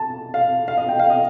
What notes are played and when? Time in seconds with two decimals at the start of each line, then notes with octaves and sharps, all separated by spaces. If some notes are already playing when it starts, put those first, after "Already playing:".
Already playing: A5
0.34 F5
0.68 F5
0.78 D#5
0.88 G5
0.99 F5
1.10 D#5